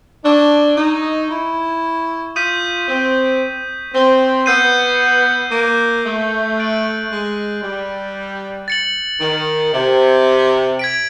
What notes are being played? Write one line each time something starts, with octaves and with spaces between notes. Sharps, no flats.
D4 C#6 E6 G#6
D#4
E4
F4 D#6 G6 B6 D#7
C4
C4
B3 E6 G6 C7 D#7
A#3
A3
F#6 A6 D7 F#7
G#3
G3
A6 C#7 F#7
D#3
C3
G#6 B6 D7